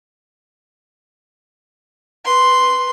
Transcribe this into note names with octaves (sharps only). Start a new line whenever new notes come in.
B4 C6